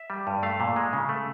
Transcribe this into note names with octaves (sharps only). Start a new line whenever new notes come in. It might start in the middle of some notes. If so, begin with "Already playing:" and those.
Already playing: E5
G3
G2
A3 F5
A#2
G#3
C#3
A3